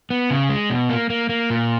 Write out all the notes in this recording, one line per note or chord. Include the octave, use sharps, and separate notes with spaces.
B3
C#3
G#3
B2
A#3
A#3
A#3
A#2